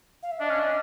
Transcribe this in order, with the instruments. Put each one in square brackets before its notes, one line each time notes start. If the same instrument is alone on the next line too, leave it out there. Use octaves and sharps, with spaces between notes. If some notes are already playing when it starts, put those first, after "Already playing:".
[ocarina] F5
E5
[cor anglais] D4 [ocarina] D#5
[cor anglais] C#4
D4